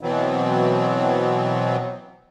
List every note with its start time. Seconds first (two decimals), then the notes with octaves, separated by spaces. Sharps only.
0.01 B2 E3 F#3 B3 C4